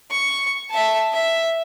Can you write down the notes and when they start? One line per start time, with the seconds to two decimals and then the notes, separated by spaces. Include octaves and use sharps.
0.11 C#6
0.70 E5 A5
1.13 E5